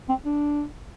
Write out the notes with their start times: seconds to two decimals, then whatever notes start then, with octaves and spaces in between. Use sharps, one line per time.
0.09 C4
0.25 D4